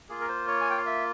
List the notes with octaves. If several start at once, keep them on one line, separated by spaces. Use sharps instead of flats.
A#3 F4 G#4
A#4
C5
C#5
G#5
G5
F5
E5